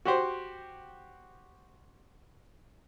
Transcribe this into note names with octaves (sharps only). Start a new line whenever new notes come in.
F#4 G4 C5